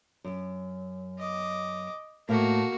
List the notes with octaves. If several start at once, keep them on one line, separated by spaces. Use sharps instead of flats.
F#2
D#5 D6
A2 A3 A#3 F#4 E5